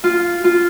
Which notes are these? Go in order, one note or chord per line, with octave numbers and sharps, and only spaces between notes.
F4
F4